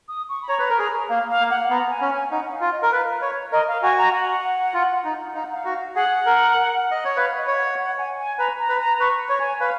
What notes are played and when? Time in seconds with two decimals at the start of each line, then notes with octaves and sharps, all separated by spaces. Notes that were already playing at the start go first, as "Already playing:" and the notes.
0.08 D#6
0.29 C#6
0.42 B5
0.49 C#5 A#5
0.59 B4
0.70 A#4
0.79 G#4
1.10 A#3 F5
1.29 F5
1.40 A#3
1.50 F#5
1.70 B3 A#5
1.90 G#5
2.01 C#4
2.11 G#5
2.31 D#4 F#5
2.52 F5
2.61 F4
2.71 D#5
2.82 A#4
2.91 B4 F5
3.22 C#5
3.52 A#4 D#5
3.68 F5
3.82 F#4 G#5
3.98 A#5
4.13 F#5
4.74 F4
5.04 D#4
5.34 D#4 F5
5.44 F#5
5.54 F5
5.65 F#4
5.96 G#4 F#5
6.26 A#4
6.91 D#5
7.05 C#5
7.17 B4 F5
7.37 D#5
7.47 C#5
7.53 F5
7.58 F#5
7.78 F#5
7.98 G#5
8.19 G#5
8.39 B4 A#5
8.59 A#5
8.69 B4
8.79 A#5
8.99 B4 C#6
9.29 C#5
9.40 G#5
9.60 B4 F5